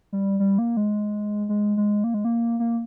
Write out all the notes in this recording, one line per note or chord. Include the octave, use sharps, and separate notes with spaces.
G3
G3
A#3
G#3
G#3
G#3
A#3
G#3
A#3
A#3